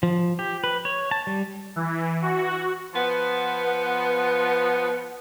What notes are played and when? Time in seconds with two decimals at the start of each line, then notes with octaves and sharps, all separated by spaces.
0.03 F3
0.39 G4
0.64 B4
0.85 C#5
1.11 A5
1.27 G3
1.76 E3
2.22 F#4
2.95 F3 B3